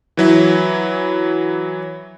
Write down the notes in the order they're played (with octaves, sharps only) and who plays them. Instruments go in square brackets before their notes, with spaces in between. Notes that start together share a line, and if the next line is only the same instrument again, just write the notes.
[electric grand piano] E3 F#3 E4